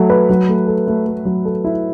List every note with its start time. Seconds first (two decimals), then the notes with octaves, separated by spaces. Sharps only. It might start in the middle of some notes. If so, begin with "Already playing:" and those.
Already playing: F#3 A3
0.10 B4
0.30 F#3
0.49 A3
0.67 A4
0.87 A3
1.07 A3
1.25 F#3
1.45 A4
1.64 E4